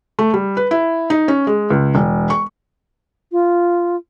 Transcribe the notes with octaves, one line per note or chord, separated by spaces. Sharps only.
A3
G3
B4
E4
D#4
C#4
G#3
C#2
E1
C#6
F4